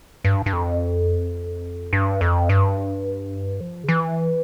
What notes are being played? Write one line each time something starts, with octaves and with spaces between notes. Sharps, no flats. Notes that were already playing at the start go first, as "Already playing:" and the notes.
G2
G2
F2
G2
F2
G2
F3
C#3
E3